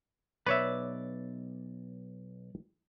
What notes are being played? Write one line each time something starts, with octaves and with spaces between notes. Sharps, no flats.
B1 B4 C#5 D5 E5